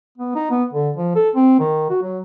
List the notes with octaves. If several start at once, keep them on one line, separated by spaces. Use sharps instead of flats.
B3
D#4
B3
D3
F3
A4
C4
D#3
F#4
F#3